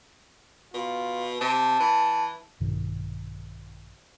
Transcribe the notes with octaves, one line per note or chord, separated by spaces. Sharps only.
B2 F4
C3 A5
E3
A#1 G2 B2 D#3